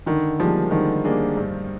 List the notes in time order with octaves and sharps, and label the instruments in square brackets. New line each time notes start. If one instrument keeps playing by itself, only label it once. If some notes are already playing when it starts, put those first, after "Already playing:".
[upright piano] D3 [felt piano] D#3
[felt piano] F3 [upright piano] G3 A#3 D4 G#4
[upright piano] D3 [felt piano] D#3
[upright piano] G3 A#3 D4 G#4
G2